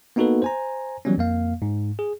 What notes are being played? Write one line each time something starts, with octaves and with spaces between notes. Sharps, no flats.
A#3 B3 D#4 F#4 A4 B4
C5 G#5 A#5
E3 F#3 G3 B3 C#4
F2 A#3 F5
G#2
G#4